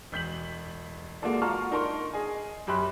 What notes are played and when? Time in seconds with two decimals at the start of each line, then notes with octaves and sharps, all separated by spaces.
0.12 E1 G6 B6 F#7
1.22 G#3 A#3 F4 F#4 A4 D5
1.42 F4 F#4 A5 A#5 C#6 F6
1.71 D4 D#4 A#4 A5 C6 C#6
2.13 G#4 D#5 G#5
2.67 F#2 G4 B5 C6 F#6